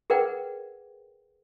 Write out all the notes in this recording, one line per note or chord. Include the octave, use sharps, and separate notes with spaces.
G#4 A#4 B4 D5 F#5 G5